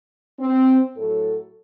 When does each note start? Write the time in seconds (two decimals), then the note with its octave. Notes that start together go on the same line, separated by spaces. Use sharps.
0.39 C4
0.96 A2 F#3 A4